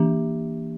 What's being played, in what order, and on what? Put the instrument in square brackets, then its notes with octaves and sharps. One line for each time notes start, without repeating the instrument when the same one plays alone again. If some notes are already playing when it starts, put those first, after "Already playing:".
Already playing: [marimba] E3 A#3 D4 G4